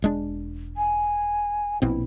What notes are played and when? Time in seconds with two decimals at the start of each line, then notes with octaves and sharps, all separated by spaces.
0.02 E1 G#3 D4
0.77 G#5
1.82 A#1 B2 C4 E4